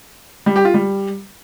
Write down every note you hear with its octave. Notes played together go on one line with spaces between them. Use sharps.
G3
G4
F4
G3